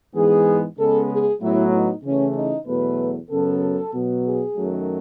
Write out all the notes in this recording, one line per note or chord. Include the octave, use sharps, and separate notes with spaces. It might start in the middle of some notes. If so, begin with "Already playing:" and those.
G#2 E3 G#3 B3 G#4
C#3 G#3 B3 A4
G#4
A2 F#3 B3 E4
D#4
C#3 E3 A3 C#4
D#4
E2 B2 F#3 A3 B4
F#2 C#3 F#3 B3 A4
B2 F#3 B3
G#4
F#2 D#3 F#3 A3